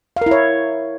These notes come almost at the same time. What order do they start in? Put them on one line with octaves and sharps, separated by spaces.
F5 A#4 E4 C#5